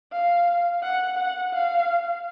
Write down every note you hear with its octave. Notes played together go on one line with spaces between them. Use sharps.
F5
F#5
F#5
F5